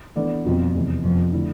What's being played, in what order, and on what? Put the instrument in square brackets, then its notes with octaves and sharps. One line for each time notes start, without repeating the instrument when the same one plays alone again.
[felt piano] E3 B3 D4 A4 D5
[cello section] F2 [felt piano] B2 G3 C4 F4
[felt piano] E2 C3 E3
[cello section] F2 [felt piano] C3 F3 B3
[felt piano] D3 A3 E4